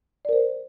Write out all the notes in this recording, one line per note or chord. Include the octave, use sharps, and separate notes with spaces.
A#4 C5 D5